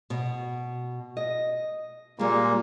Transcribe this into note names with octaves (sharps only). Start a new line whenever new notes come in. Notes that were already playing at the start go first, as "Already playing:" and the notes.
B2
D#5
A#2 G3 G#3 A#3